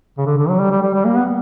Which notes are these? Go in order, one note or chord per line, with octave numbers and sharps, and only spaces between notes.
C#3
D3
D3
F#3
G3
G3
G3
G3
A#3
B3